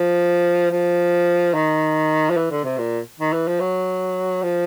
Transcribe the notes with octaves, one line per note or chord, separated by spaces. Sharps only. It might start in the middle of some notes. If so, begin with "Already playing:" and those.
Already playing: F3
F3
D#3
F3
E3
D3
C3
A#2
D#3
E3
F3
F#3
F3